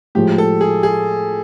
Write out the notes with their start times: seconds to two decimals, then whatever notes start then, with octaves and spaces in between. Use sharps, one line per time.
0.15 A2 F3 G#3 G4
0.38 A4
0.61 G#4
0.83 G#4